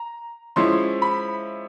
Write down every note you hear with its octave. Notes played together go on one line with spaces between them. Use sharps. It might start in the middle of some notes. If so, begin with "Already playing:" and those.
Already playing: A#5
F3 G#3 C#4 E4 C6
B5